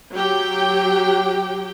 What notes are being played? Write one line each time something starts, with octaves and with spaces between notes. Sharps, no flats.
F#3 G4 G5